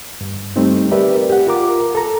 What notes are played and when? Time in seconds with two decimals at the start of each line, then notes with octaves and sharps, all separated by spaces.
0.21 G2
0.56 G3 A3 C4 D#4
0.91 G4 A#4 B4 D5 E5
1.30 G4 F#5
1.47 F4 A#4 A#5 D6
1.95 A4 A#5